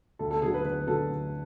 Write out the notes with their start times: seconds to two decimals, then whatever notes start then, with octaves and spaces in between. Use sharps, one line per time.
0.19 D2 A4
0.31 A4
0.42 D3 F#3 G#4
0.54 B4
0.65 D2 B4
0.87 D3 F#3 A4
1.09 D2